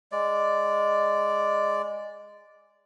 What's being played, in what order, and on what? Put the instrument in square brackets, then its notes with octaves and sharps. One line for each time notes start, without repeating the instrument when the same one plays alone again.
[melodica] G#3 D5